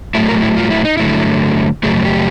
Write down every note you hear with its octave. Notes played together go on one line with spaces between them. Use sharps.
A2 F#3 A3 E4
A#4
E4
F4
E4
D#4
G2 D3 F#3 A3 E4
F#2 C#3 F#3 A3 G#4
G4